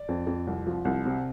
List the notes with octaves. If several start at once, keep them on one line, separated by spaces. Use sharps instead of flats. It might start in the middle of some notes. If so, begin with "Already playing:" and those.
Already playing: D5
F2
F2
C2
F3
C2
C3